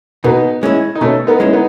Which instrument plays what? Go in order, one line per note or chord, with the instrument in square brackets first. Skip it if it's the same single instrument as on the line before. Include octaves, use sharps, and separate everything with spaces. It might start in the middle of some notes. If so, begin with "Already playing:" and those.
[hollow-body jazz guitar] B2 [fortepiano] B3 D#4
[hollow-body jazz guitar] G#3 C#4 E4
[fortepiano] D#4
[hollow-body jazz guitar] B2 [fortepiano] A3 C#4
[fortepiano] B3 D#4
[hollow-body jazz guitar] G#3 C#4 E4
[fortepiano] B3 D#4